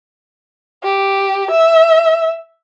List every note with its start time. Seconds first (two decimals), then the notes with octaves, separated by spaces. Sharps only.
0.84 G4
1.51 E5